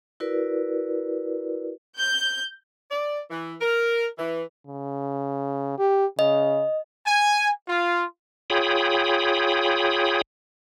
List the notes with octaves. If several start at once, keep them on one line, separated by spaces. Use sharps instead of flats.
E4 F#4 A#4 B4 D5
G6
D5
E3
A#4
E3
C#3
G4
C#3 D#5
G#5
F4
F4 G#4 C#5 G5 B5 D#6